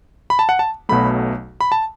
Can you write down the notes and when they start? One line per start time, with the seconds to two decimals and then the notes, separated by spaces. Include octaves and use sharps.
0.30 B5
0.39 A5
0.49 F#5
0.59 A5
0.89 B1 B2 F#3 A3 B5
1.61 B5
1.72 A5